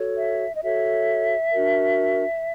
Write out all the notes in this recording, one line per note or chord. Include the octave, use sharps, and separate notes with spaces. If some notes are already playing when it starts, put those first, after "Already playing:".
Already playing: F#4 A4 C#5
E5
D#5
F#4 A4 C#5 E5
D4 F#4 A#4